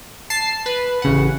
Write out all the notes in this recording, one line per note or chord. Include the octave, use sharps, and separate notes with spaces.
A5 C7
B4
A1 C#3 F#5